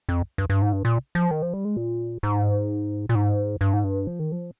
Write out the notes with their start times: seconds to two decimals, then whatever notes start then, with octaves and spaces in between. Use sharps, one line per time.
0.09 F2
0.38 G2
0.50 G2
0.62 G#2
0.73 G2
0.85 A#2
1.15 F3
1.31 D#3
1.42 F3
1.54 G3
1.65 G#3
1.77 A#2
2.23 G#2
3.09 A#2
3.15 G#2
3.61 G2
3.73 G#2
3.84 G2
4.07 F3
4.20 D#3
4.32 F3